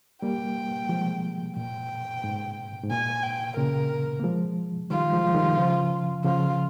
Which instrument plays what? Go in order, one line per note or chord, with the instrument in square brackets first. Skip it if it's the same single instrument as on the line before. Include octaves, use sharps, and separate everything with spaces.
[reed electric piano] G3 A#3 [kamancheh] G5
[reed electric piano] F3 G#3
[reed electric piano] A#2 [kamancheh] G5
[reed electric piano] G#2
G#2
[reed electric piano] A#2 [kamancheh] G#5
[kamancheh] G5
[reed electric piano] A#2 C#3 [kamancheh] A#4
[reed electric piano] A#3
F3 G#3
[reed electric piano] D#3 G3 [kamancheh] F4
[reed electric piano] F3 G#3
F3
D#3 G3
C#3 F3
[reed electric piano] C#3 F3 [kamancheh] F4